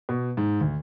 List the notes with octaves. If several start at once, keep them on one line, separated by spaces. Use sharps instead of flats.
B2
G#2
D2